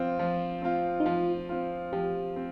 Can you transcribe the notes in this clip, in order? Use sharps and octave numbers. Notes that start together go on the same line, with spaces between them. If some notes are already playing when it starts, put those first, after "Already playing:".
Already playing: F3 C4 F4
F3
C4 F4
D#4
F3 F4
C4 F4
F3 G4
C4